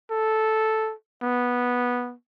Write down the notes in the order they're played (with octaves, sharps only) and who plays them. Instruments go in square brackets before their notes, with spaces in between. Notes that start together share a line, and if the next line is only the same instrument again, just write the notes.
[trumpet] A4
B3